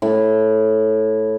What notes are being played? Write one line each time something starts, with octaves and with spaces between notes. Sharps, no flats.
A2